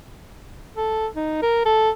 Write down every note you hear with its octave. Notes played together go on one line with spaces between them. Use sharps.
A4
D#4
A#4
A4